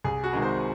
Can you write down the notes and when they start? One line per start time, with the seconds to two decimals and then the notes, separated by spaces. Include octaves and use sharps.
0.04 C2 G#4
0.24 F#4
0.33 C3 D#3 G#3
0.42 C5